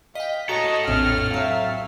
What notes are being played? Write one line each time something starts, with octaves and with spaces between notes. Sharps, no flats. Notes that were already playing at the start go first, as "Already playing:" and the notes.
D#5 F5 G5 B6
F#4 A4 C#5 D#5 A#5
A#1 F2 A2 C4 F6
A2 F#3 E5 F5